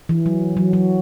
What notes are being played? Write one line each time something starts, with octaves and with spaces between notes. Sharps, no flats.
E3
F#3
F#3
F#3